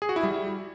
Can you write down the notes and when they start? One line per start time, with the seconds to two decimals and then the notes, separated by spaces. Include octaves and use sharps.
0.02 G#4
0.09 F#4
0.16 E4
0.23 G3